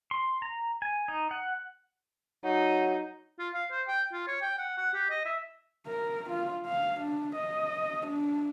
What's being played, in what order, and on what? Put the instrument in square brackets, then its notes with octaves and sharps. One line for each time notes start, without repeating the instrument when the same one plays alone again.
[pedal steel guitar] C6
A#5
G#5
D#4
F#5
[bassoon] F#3 [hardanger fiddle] D#4
[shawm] F4
F5
C5
G5
F4
C#5
G5
F#5
F#5
G4
D#5
E5
[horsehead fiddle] A#4
F4
F5
D4
D#5
D4